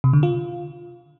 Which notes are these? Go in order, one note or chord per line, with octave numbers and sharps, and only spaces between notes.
C3
D3
F4